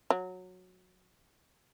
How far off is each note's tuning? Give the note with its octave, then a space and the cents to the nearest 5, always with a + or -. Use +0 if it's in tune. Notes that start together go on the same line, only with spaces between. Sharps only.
F#3 -15